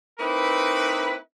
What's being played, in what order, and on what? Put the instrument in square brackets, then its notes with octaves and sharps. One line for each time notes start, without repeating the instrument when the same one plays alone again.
[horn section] A#3 C4 D#4 E4 B4